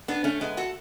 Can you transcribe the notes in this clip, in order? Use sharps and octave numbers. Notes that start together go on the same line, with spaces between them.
B3 D4
A3 C#4
G#3 B3
F#4 A4